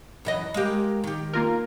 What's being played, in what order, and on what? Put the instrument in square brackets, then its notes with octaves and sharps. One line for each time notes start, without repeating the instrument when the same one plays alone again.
[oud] F#2 E3 D#5
G#3 A#3 G4
D#3 G4
[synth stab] A#3 F4 A#4